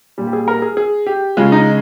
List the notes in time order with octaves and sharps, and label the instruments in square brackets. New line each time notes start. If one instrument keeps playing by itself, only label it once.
[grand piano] A#2 G3
G4
G#4
A#4
G#4
G#4
G4
C#3 G#3 F4
D#4